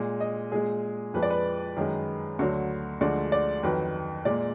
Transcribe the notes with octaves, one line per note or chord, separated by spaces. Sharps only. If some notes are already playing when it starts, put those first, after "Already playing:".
Already playing: A#2 G#3
D#5
A#2 G#3 G#4
F2 F3 G#3 B4
D5
B4
F#2 D#3 G#3
D2 D3 F#3
D2 D3 F3 G#3 D5
D5
F2 D#3 F#3 B4
A#2 G#3 D5